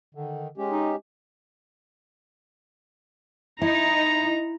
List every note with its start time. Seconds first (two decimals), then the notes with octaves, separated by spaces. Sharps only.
0.15 D3 D#3
0.58 G#3 C#4 G4
0.70 D#4
3.62 D#4 E4 A#5